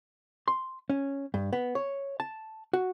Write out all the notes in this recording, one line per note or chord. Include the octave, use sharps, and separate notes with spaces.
C6
C#4
G2
B3
C#5
A5
F#4